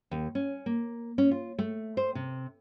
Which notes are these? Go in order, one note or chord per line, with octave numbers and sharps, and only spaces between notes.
D#2
C#4
A#3
C#4
F4
A3
C5
C3